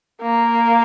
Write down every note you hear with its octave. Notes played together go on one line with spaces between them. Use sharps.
A#3